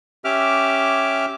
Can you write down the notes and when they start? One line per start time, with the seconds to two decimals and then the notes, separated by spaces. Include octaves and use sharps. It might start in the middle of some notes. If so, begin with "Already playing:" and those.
0.25 C#4 G4 E5 D6 F6